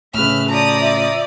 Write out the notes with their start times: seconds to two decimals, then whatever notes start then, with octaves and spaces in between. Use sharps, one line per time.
0.14 A2 C#3 B4 E5 F6
0.49 F3 D5 A5 A#5 D#6
0.81 E5